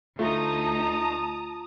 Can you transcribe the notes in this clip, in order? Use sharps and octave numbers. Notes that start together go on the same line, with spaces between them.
D2 A3 D#4 F4 A5 A#5 D#6